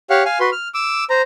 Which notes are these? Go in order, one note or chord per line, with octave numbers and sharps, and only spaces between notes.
G4 C#5 F5 F#5
F5 G#5
F#4 B4 C6
F6
D6 E6
C5 A#5